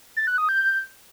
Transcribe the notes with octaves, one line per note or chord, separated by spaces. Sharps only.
A6
F#6
D#6
G6